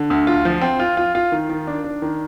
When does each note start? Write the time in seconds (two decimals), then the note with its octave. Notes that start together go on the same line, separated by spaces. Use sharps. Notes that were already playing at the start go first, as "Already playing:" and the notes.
Already playing: D3
0.10 D2
0.27 F4
0.45 F3
0.61 C4
0.79 F4
0.97 F4
1.15 F4
1.32 D#3
1.49 D#3
1.67 D4
1.84 D4
2.02 D#3